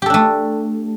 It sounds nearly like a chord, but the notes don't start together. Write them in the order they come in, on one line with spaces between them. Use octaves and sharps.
G4 A4 D4 A3